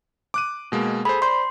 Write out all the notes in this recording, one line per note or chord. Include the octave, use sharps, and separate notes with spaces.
D6 F#6 D#7
B2 G#3 A#3
G#4 A4 C5 B5
C5 D5 C6 G6